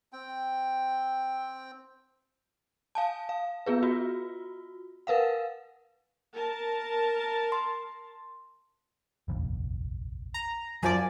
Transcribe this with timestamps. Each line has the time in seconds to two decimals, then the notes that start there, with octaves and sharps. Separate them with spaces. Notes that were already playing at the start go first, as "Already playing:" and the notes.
0.13 C4 G5
2.95 F5 G#5 A5
3.29 F5
3.66 B3 F4 G#4 B4
3.83 F4 F#4
5.07 A#4 B4 F5 F#5
6.35 A#4 A5
7.52 C6
9.28 F1 A#1 D#2
10.34 A#5
10.83 F#2 F3 F#3 D5 G#5